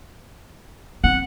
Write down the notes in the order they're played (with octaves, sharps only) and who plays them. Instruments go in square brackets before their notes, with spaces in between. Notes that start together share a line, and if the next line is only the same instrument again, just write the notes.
[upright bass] C4 [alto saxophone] F#5